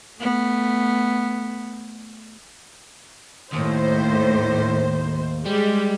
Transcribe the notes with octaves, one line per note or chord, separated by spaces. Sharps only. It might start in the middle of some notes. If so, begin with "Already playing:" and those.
A3 B3
D#2 A2 D#3 C5
G3 G#3 G4